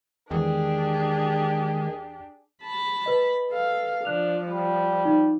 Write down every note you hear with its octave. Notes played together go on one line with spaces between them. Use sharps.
E2 D#3 G#3 D4 G4 G#4
A5 B5
B4 D#5
A4 F5
F3 D4 F#6 F7
G3
D#4